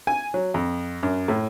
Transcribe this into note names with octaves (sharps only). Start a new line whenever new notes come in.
G#5
F#3
F2
F#2
A2